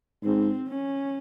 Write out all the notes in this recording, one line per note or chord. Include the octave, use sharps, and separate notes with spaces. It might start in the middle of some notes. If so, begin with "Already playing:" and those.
G#2 C4
C#4